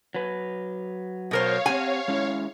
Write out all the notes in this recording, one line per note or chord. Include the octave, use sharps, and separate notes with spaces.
F#3 B4
B2 A#4 C5 C#5 F5
C4 G4 F#5 G#5
G#3 C#4 E4